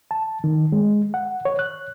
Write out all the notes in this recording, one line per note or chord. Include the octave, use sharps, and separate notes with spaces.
A5
D#3
G#3
F#5
C#5
F#6